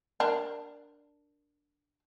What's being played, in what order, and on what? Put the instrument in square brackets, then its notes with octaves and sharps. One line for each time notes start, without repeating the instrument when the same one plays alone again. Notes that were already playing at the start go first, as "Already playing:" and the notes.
[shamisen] D4 A#4